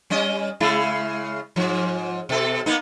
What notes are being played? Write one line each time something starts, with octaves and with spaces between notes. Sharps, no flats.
G3 C#4 D#5
C#3 G#3 E4
G#2 F3
B2 A4
A#3 B3 D#4